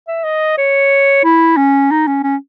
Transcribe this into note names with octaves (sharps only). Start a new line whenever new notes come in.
E5
D#5
C#5
E4
C#4
D#4
C#4
C#4